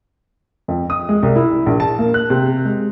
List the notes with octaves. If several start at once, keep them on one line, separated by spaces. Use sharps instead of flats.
F2
D#6
G#3
C2
E4
A#1
A5
A#3
F#6
C3
G#3